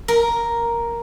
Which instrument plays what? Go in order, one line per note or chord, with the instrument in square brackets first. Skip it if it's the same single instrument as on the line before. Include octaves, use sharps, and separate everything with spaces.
[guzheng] A#4